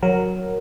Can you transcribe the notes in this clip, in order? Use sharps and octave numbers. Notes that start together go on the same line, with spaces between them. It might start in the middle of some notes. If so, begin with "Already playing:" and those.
F#3 A#4